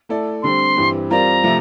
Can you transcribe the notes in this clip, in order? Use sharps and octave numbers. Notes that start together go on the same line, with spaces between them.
A3 E4 A4 D5
D3 G3 C4 C6
G2 E3 G3 C4 G4
G3 C4 F4 A#4 D5 A#5
C3 F3 A3